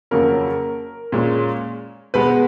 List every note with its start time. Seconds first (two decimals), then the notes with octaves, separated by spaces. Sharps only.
0.11 F2 C#3 F#3 A#3 C#4 A#4
1.12 A#2 G#3 C#4
2.14 B2 G#3 B3 B4